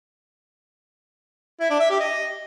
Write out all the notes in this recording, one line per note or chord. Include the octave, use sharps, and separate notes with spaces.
E4
D4
E5
G4
D#5